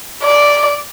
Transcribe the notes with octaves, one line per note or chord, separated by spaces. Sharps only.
D5